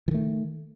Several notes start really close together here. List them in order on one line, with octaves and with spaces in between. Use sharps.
E3 D#3 A3